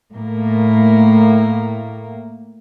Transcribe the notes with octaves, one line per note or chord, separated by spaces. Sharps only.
A2 A#3